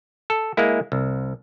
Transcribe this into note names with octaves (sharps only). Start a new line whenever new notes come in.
A4
G#3 A#3 E4
C2